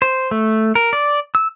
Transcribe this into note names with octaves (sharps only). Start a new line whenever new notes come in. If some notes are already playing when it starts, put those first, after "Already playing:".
C5
A3
A#4
D5
E6